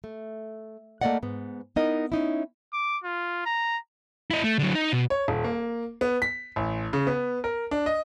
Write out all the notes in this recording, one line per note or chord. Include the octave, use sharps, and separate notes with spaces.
A3
A3 A#3 C#4 D5 D#5 F#5
G#2 B3
B3 D#4 E4 A#4 D#5
C#4 D#4 E4
D6
F4
A#5
E4 D#5
A3
D3 F#3
D#4
B2
C#5
D#1
A#3
B3
B6
A1
C#3
B3
A#4
D4
D#5